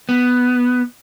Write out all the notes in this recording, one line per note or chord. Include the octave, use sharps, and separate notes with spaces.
B3